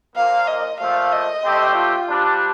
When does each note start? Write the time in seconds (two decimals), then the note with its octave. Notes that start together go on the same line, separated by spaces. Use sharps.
0.15 A#2 F3 A#3 F5
0.47 D#5
0.79 A#2 F3 A3 F5
1.12 D#5
1.44 D3 A3 C4 G4 C5
1.76 F4
2.08 C3 G3 D4